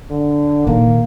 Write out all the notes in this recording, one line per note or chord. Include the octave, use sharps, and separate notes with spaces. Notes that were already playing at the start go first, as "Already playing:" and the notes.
D3
A#2 D#3 A#3